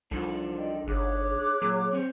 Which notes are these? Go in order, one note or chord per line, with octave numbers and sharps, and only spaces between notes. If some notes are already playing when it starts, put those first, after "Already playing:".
C2 F3 D4 D#4 A4
D5 D#5 G5
G1 G#4 C#5 D6 F#6
A#2 F#3 A#3
C4 C5 C#5